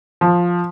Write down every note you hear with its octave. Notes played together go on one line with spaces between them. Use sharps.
F3